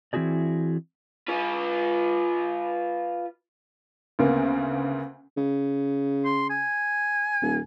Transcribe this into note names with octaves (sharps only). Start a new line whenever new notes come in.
E3 C4 E4 F#4 G#4 D5
F4 B4
D2 C#3 A#3 B3
C#3
C6
G#5
D#1